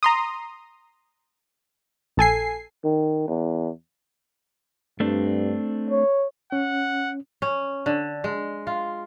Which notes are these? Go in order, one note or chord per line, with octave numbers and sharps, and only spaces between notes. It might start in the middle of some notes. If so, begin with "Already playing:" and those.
A#5 C6 D#6
A#1 A4 G#5 C7
D#3
E2
G2 A3 C4 D4
C#5
C#4 F#5
C#4
D3
G#3
F4